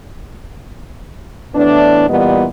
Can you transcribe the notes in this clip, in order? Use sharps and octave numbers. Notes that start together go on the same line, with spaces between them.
A2 E3 B3 D4
A#2 E3 G3 B3 D#5